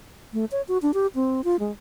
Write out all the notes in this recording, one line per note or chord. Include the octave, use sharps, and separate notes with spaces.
A3
C#5
F#4
D4
G4
C4
F4
G#3